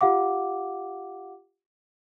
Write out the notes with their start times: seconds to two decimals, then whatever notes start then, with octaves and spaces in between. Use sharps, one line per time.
0.01 F4 G4 F5 F#5 D6